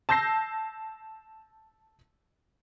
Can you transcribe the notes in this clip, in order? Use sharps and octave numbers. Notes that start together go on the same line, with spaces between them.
A5 E6 G6 A#6 C7